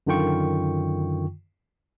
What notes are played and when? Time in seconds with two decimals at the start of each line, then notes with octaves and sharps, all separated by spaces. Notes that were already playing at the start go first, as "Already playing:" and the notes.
0.07 F#2 D3 D#3 F4 G5 C#6